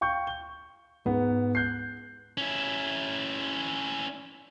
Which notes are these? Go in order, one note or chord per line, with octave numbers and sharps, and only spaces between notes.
F5 G5 C#6 G6
G7
G#2 B3 F#5
F#6 G6 C7
C#4 E4